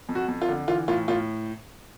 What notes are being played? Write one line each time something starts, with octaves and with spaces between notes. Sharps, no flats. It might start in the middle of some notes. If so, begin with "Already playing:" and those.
F2
F#4
F2
F4
D3
E3 F4
A2 F4
A2 F4